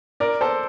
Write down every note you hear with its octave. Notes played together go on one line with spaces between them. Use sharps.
A#4 D5
A4 C5